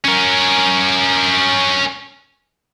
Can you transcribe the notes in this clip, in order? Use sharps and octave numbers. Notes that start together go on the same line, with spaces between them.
C#4 A#4